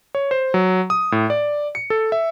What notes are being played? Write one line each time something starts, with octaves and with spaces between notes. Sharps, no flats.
C#5
C5
F#3
D#6
A2
D5
C#7
A4
E5